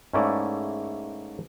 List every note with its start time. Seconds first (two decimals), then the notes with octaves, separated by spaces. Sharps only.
0.14 G#2 A3 A#3 C#4 E4 D5